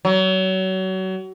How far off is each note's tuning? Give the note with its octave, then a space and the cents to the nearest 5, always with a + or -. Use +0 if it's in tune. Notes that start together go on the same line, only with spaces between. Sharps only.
F#3 +30